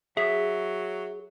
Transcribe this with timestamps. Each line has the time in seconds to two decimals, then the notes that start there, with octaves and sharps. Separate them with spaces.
0.17 F#3 G#4 E5